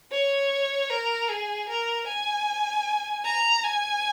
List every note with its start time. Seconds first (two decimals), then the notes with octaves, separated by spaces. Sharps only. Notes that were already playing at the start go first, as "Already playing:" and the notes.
0.11 C#5
0.90 A#4
1.29 G#4
1.68 A#4
2.07 G#5
3.24 A#5
3.64 G#5